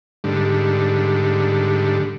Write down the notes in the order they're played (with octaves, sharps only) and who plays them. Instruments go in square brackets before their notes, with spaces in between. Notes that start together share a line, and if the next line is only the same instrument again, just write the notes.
[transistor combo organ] G#2 D3 G3